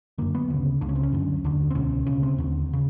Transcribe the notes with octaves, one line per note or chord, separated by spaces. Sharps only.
F#2 D3 A#3
B3
D2 C#3
C#2 C#3 D4
C#4
C4
C#4
F#2 D3
D#2 D3 D4
C4
C#2 B2 C#4
D2 C#3 C#4
C4
D#2 D3
C#3